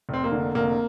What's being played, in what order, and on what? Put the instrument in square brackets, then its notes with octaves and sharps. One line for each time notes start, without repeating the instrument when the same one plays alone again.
[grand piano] F1 C4
A#3
D3
F1 A#3